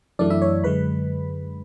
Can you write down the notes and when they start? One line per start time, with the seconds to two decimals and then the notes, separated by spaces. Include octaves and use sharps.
0.19 F#2 E3 A3 D4 D5
0.30 E4 E5
0.42 C#5
0.64 F#2 D3 G#3 B4 B5